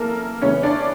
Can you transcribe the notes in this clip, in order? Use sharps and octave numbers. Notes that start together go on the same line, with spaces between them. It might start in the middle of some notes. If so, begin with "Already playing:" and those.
Already playing: C#3 E3 A#3 A4 A#4
C#3 E3 G#3 B3 C#4 C#5
D4 D5